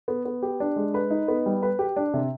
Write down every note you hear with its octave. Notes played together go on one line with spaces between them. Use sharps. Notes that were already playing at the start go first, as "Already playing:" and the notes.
B3
B3
G4
D4
G#3
B4
D#4
B3
G3
B4
G4
D4
C3